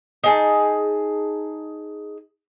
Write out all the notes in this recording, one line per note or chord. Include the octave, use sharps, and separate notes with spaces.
D#4 G#4 A5